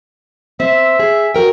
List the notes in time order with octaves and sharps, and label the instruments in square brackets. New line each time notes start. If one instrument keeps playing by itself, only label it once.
[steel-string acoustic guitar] C4 [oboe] E5
[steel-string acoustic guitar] G#4
F#4 A#4 G5